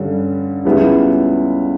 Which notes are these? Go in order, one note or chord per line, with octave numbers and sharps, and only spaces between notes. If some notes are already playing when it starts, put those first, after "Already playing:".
Already playing: G2 D3 G3 C#4
C#2 C#3 G3 B3 E4